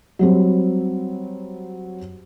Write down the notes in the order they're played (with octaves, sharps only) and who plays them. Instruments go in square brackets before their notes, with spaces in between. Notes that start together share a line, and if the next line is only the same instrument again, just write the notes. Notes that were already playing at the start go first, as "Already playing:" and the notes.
[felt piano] F#3 G3 C4